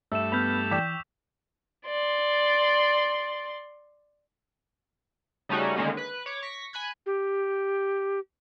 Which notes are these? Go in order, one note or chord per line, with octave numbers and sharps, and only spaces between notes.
G2 A3 E5 E6 E7
B3 B5 F6 G6 B6 F7
E3 D5 G5 C#6 D6 G6 B6 E7
D5 C6
C#3 G3 A3 C#4 D#4 F#4
D3 D#3 G#3 A#3 C#4
B4 F#6
C#5 D6
C#6 A#6 B6
G#5 B5 F#6 G#6
G4